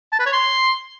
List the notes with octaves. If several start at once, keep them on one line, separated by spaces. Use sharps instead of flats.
A5
B4
C#5
C6